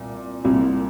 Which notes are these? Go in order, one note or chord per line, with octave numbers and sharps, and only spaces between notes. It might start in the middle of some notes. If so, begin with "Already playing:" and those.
Already playing: C2 A#2
C2 A#2